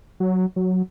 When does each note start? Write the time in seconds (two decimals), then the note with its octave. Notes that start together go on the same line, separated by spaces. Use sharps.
0.20 F#3
0.56 F#3